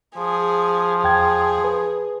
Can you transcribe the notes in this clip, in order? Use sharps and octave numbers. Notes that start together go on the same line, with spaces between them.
F3 G#4
E2 G#4 G5 G#6
B4